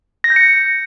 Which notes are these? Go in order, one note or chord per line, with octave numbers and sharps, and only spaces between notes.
A#6
G6
C#7